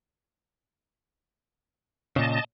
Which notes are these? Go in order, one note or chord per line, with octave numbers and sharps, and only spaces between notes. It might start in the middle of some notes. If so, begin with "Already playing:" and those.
A#2 C#3 D#5 A5